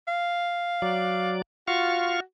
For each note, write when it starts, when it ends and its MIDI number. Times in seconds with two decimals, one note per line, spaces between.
0.08 1.33 77
0.82 1.42 54
0.82 1.42 74
1.68 2.20 65
1.68 2.22 66
1.68 2.20 77
1.68 2.20 85